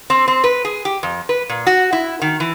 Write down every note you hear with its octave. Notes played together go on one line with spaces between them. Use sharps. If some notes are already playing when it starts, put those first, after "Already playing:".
C4
C4
B4
G#4
G4
F2
B4
A#2
F#4
E4
D#3
E3